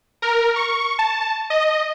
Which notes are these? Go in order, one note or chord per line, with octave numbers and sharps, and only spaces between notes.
A#4
C#6
A5
D#5